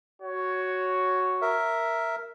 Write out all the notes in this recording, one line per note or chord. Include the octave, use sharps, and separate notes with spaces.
F#4 C#5
A#4 E5